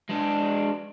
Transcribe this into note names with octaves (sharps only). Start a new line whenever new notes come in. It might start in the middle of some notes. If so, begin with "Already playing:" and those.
G#3 D4